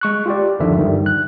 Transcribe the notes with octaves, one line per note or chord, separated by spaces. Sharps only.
G#3 C#6 F#6
F4 G4 D5
G1 D#2 D3 D#3 F3 E5
G2 D3 D#3 G3
F#6